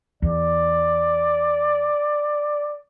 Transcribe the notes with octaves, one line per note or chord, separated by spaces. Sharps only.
E2 D5